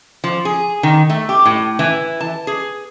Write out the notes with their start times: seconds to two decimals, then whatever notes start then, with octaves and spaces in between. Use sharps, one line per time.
0.24 F3
0.45 G#4
0.83 D#3
1.10 A3
1.29 G4
1.45 A2
1.79 E3
2.21 A5
2.47 G#4